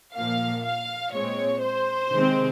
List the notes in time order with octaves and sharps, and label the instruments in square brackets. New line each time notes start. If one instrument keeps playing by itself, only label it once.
[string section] A#2 F3 A#3 F5
F5
A#2 G#3 C4 C#5
C5
C3 D#3 G#3 C4